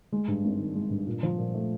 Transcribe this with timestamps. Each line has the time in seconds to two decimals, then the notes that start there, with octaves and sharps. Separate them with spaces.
0.12 G#3
0.28 G2
0.44 G#1
0.59 D#3
0.75 G#3
0.90 G2
1.07 A#2
1.23 F3
1.39 A#2
1.54 A3